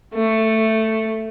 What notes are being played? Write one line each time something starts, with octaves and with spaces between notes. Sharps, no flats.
A3